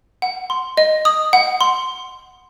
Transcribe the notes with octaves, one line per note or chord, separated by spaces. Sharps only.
F#5
C6
D#5
D#6
F#5
C6